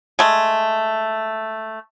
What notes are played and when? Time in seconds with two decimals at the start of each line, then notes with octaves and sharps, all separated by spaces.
0.19 G#3 A3